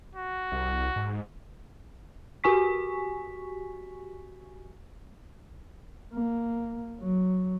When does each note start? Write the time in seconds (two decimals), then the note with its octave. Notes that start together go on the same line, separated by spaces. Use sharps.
0.15 F#4
0.52 C2
0.96 G#2
2.44 F#4 G4 G#5 C#6 B6
6.14 A#3
7.01 F#3